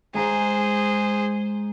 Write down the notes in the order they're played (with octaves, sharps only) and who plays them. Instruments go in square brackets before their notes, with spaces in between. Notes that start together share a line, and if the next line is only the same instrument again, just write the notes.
[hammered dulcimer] G#3 A#5 [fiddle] G#4 C5